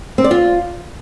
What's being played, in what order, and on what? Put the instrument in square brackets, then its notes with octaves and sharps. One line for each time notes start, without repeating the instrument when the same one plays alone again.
[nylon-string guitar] C4
D5
F4